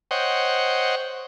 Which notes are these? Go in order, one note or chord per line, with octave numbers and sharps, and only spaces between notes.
C5 C#5 D#5 F#5 G5